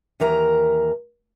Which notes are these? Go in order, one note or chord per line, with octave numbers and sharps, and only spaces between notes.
D#2 E3 A#4 A#5